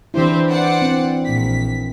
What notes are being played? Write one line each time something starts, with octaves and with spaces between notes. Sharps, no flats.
E3 C4 D4 E4 G4 C5
C5 D5 F#5
C4
A#1 B6